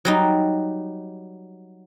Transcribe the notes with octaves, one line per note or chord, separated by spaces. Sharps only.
F#3 G3 D#4